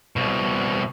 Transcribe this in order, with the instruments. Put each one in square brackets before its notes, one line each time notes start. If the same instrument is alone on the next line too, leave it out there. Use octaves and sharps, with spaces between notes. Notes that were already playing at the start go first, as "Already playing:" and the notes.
[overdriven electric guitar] C2 B2